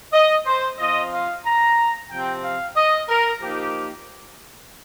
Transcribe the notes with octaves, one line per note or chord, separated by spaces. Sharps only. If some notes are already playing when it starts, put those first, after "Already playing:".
D#5
C5
F3 C4 F4 D#5
F5
A#5
C3 F3 C4 G5
F5
D#5
A#4
F3 A#3 D#4 G4